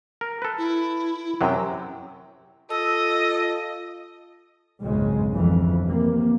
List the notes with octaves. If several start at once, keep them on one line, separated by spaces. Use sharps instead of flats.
A#4
A4 B4
E4
F#2 C3 F#3 G5
F4 A4 D#5 E6
F#1 B1 F2 G#2 C#3 G#3
G1 F2 E3
C3 A#3